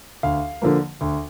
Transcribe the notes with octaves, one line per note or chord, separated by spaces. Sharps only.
D2 F5
D3 F3 A#3
D2